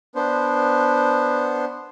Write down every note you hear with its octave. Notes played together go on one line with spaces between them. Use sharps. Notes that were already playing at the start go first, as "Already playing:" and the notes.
B3 D4 C5